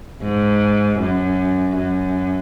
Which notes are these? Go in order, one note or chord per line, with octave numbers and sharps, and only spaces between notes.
G#2
F#2
F#2